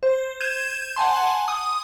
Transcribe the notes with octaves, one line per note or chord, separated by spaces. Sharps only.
C5
G6 G#6 D#7 E7
F#5 G#5 A5 C6
D#6